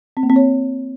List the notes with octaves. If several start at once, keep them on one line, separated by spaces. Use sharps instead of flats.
C4
A#3
C4
C#5